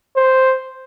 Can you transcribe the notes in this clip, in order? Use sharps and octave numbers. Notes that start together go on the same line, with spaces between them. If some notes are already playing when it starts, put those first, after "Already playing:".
C5